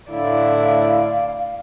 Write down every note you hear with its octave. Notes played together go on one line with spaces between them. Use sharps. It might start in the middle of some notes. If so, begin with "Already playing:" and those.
A2 D3 E4 D5 F5